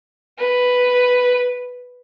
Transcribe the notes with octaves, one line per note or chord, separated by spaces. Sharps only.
B4